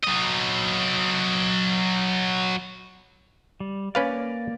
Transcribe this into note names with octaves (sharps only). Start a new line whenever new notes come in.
F#3 D#5
G3
A#3 C#4 B4 D5 F5